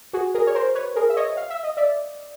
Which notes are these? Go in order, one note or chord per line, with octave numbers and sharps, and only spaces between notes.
F#4 G#4
G#4 A#4
C#5
A#4 C5
B4 C#5
G#4 A#4
E5
C#5 D#5
F5
E5
D#5
D5 E5